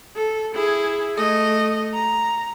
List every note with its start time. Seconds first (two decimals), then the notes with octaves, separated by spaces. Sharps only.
0.16 A4
0.54 E4 G#4
1.15 A3 D#5
1.94 A#5